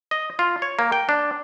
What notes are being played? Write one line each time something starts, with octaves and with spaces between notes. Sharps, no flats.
D#5
F4
C#5
A#3
G5
D4